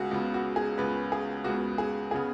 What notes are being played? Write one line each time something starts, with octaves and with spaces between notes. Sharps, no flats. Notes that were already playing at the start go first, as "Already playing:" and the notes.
Already playing: C#2 C#3 B3 F#4 G#4
C#2 C#3 B3
F#4
G#4
C#2 C#3 B3 B4
G#4
C#2 C#3 B3 F#4
G#4
C#3 B3 G#4